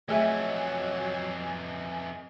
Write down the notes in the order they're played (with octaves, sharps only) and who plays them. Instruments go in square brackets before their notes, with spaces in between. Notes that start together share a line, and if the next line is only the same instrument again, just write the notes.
[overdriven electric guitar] F2 E3 [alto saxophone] F#3 [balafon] A3 G#4 E5 [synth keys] D#5 G#5